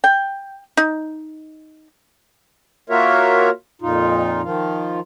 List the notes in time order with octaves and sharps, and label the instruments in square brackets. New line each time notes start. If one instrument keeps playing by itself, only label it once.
[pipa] G5
D#4
[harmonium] A#3 F4 F#4 A#4 C#5 E5
F2 A#2 D#4 F4
D#3 F3 F4